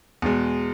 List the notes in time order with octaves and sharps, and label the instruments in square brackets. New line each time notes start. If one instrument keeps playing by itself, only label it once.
[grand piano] E2 B2 G#3